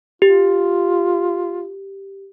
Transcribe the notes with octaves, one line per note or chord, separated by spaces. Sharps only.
F4 G4